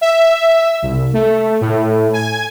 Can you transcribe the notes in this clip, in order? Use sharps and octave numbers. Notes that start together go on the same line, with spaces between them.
E5
C2
A3
A2
G#5